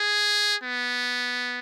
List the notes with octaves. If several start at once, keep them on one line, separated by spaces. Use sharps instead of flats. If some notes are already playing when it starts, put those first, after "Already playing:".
Already playing: G#4
B3